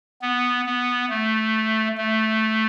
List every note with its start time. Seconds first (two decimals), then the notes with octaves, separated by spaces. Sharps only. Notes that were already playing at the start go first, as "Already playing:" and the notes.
0.22 B3
0.66 B3
1.10 A3
1.98 A3